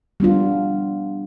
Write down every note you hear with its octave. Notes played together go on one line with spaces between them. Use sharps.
G3 B3 D4 F4